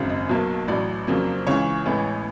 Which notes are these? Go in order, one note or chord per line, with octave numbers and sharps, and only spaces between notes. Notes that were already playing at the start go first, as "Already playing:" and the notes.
Already playing: G#1 F#2 C#3
D#5
B1 B2 F#3 A#3
A1 A2 F#3 D5
F2 C#3 F#3 A#3
C#2 C#3 E3 C#5
A1 A2 E3 G#3 B3